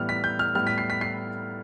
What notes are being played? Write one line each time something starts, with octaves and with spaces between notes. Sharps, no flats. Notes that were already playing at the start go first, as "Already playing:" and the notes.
Already playing: A2 E3 G3 B3 F6
B6
G6
F6
A2 G3 B3 F6
B6
C7
B6
C7